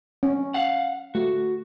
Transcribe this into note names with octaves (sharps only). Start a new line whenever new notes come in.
C#4
F5 F#5
A3 F#4